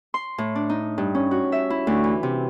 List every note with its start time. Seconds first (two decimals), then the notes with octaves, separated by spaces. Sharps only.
0.14 C6
0.38 A2
0.55 D4
0.69 D#4
0.98 G2
1.15 C#4
1.31 F#4
1.52 E5
1.70 E4
1.87 D2
2.04 E3
2.23 C3